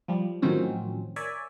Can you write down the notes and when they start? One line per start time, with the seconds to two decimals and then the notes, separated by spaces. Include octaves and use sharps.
0.08 F3 G3
0.42 A2 D#3 F3 F#3 C4 C#4
1.16 A#4 C#5 D5 E5 G#5